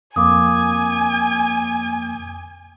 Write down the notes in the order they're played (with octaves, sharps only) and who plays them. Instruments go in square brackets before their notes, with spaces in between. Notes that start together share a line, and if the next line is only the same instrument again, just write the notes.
[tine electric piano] F2 A#3 [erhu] G#5 [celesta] D6 D#6